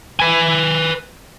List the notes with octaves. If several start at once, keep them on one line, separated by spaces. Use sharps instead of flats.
B4 G#5